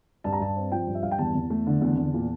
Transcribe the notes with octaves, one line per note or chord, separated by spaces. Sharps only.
G2 A5
A#5
G2 A5
C4
F3 G5
G2
E5
G2 F5
G5
E2 A5
E2
A3
D3
E2
E2
A#2